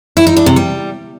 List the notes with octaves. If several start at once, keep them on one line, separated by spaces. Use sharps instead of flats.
E4
D#4
D4
C3
G3